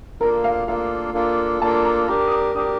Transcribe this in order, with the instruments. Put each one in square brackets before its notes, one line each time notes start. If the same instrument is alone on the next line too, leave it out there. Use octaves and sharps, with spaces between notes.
[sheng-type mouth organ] A#3 D4 F4 A4 [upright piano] A#4
[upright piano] F5
[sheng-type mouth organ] A#3 D4 F4 A4 [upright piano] F5
[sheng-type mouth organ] A#3 D4 F4 A4
[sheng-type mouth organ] A#3 D4 F4 A4 [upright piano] A5
[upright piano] A#5
[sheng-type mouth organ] D4 G4 A#4 [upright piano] A#5
[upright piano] D#6
D6
[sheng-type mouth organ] D4 G4 A#4 [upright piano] D#6